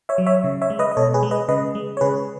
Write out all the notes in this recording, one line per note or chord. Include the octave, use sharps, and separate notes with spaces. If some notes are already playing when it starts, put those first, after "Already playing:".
C#5 E5
F#3
C#5 E5
C#3
C#5 E5
G#3
B4 D#5
D#5
B2 A4 C#5
G#4 B4
G#3
B4 D#5
C#3 B4 D#5
G#3
C#5
C#3 G#4 B4